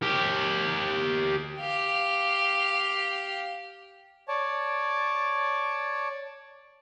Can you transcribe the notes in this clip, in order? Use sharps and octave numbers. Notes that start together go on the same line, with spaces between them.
G4 A#4
G4 F5
C#5 D5 A5